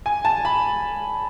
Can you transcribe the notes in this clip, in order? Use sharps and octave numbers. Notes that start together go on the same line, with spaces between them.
G#5
A5
B5